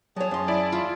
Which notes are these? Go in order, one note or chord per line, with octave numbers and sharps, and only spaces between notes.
F#3 G#4 C#5 A5 D#6
F#2 C6
E4 D5
F4